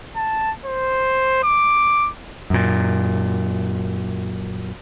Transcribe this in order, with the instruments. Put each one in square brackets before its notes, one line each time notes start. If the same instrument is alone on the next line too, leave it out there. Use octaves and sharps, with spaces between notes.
[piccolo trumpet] A5
C5
D6
[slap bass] F#2 A#2